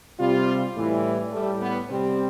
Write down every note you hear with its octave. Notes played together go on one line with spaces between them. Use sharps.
C3 G3 F4
A2 E3 G3
A2 G3 A3
B3
C3 G3 C4